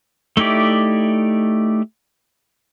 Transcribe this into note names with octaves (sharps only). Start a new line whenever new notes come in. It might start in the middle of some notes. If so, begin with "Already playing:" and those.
A3 D#4 E4 G4 D5